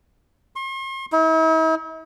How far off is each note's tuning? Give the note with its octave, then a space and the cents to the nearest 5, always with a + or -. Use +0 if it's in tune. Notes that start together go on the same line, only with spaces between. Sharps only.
C6 +45
E4 -45